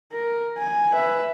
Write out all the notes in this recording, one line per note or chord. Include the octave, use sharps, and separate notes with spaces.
A#4
G#5
B4 E5